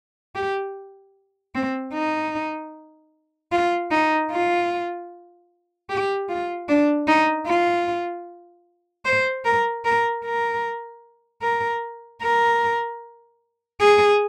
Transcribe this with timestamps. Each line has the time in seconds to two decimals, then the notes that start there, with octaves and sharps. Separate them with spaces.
0.35 G4
1.55 C4
1.94 D#4
3.52 F4
3.91 D#4
4.32 F4
5.90 G4
6.29 F4
6.69 D4
7.08 D#4
7.47 F4
9.05 C5
9.45 A#4
9.85 A#4
10.24 A#4
11.42 A#4
12.22 A#4
13.80 G#4